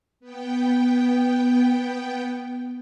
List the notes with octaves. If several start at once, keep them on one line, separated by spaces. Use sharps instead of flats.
B3 G5